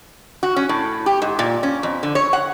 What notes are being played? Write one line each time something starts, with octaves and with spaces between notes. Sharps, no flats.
F#4
C#4
A2
G4
G#2
A#2
C#4
F2
D3
C#5
F#5